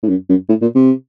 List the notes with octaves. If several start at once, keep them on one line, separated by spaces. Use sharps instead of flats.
A2
F#2
F#2
A2
A#2
C3